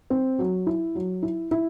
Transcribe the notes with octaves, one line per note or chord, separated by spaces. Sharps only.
C4
F#3
E4
F#3
E4
E4